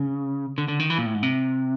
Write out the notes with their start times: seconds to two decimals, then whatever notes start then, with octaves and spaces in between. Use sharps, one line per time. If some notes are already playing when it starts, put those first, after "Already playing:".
Already playing: C#3
0.58 D3
0.68 D3
0.80 D#3
0.90 E3
0.98 A#2
1.06 A2
1.15 G#2
1.23 C3